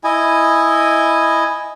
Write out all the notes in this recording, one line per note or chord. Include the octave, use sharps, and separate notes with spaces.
E4 D#5 G#5